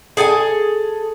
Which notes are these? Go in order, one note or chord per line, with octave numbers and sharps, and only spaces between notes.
G#4 A4 G5 G#5